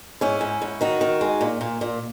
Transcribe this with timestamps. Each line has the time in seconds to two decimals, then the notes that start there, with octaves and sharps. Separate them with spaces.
0.21 G#2 C#4 E4
0.41 G#2
0.62 G#2
0.81 D#3 D#4 F#4
1.01 D#3
1.21 G#3
1.41 A#2
1.61 A#2
1.81 A#2